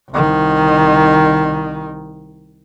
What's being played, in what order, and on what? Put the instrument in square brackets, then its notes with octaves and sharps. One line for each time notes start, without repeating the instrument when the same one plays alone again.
[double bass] C2 D#3